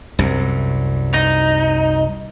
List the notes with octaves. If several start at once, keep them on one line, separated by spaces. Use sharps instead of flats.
C2 F#2
D#4